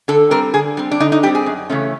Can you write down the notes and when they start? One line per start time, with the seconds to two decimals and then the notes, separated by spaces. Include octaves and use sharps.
0.08 D3 A4
0.31 G3 C4 A#4
0.54 D3 G#4
0.77 G3 C4
0.91 D4
1.00 D3 D#4
1.12 D#4
1.23 G3 G4
1.26 C4
1.35 G#4
1.46 F#2
1.70 C#3 E3 A3 C#4